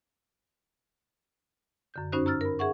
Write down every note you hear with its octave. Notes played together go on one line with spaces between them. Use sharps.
F#2 D3 G6
G2 C#4 D#4 F#4 C5 F#6
A#5 E6 F6 A6
A#4 B5
G#4 E5 F#5 C#6